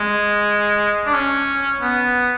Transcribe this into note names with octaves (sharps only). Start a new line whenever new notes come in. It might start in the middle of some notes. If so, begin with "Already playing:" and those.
Already playing: G#3
D4
C#4
B3